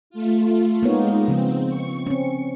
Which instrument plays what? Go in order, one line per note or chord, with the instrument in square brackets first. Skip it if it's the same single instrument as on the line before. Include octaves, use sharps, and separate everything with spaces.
[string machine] A3 F4
[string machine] G#3 D#4 [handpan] A#3 B3 C#5
[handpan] C#3 F3 B3 [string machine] C4
[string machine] C#6
[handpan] C4 C#4 [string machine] C#7